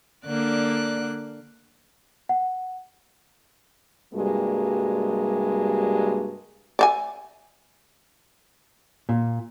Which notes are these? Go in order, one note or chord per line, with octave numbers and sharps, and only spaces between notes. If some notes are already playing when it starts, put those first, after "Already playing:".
D3 A#3 D5 F#6
F#5
G2 C3 G3 G#3 A#3 F#4
D5 E5 G#5
A#2